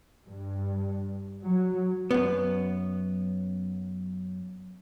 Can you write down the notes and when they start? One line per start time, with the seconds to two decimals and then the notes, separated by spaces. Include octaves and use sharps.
0.24 G2
1.44 F#3
2.11 F#2 B3